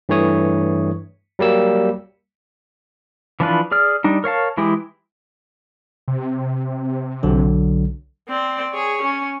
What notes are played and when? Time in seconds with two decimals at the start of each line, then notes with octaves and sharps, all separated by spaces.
0.09 G2 E3 A3 C#5 D#6
1.39 F#3 G3 A#3 E6
3.40 E3 F3 D4 F4 B4
3.72 G#4 D5 F6
4.04 G3 D4 D#4
4.24 A#4 C#5 F5 A5
4.57 E3 G#3 E4 G4 G#4
6.08 C3
7.23 B1 D3 F#3
8.29 C4 D5
8.73 G#4 C#5
9.02 C#4